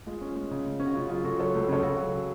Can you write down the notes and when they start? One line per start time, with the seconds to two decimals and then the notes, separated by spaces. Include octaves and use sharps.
0.07 G#3 F4
0.21 C#4
0.36 G#3
0.51 C#3
0.66 G#3
0.80 C#4
0.86 F#4
0.94 C#3 F4
1.09 F#3 F4 G#4
1.24 C#3 F#4 A4
1.39 F#3 A4 C#5
1.55 C#2
1.69 C#3 A4 C#5
1.83 C#3 F#4 A4
1.98 F#3